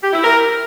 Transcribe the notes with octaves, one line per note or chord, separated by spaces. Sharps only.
G4
E4
A#4